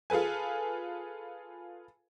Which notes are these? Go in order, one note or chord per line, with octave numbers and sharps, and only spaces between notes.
F4 G#4 A4 B4 G#5